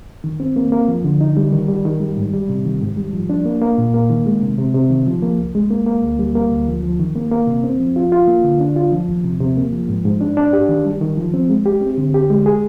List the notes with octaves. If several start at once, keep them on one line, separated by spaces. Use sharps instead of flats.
D#3
C4
A#3
A#3
F3
D3
D#4
G3
D#3
G3
D#3
G3
G#2
G3
C3
D#3
G#2
G3
F3
D4
A#3
A#3
A#2
A#3
D#3
G#3
C3
C3
C3
D#3
F3
A#3
C2
G#3
A#3
A#3
D2
G3
A#3
D2
F3
F3
D#3
A#3
A#3
C3
C4
F3
F4
F4
A#3
D3
D4
F4
F3
D#2
C3
C3
A#3
F3
G#2
G#2
D4
D4
G4
D#3
G3
D#3
F3
C4
G#3
G4
C4
D3
G4
G#3
G#4